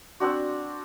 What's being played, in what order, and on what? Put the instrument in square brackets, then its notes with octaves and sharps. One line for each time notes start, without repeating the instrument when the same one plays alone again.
[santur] C4 D4 F#4